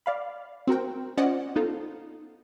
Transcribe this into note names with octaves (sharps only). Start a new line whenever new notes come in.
D5 F5 B5
C4 F#4 A#4 G5
C#4 F4 C5 D5 D#5 F#5
B3 D#4 F4 A4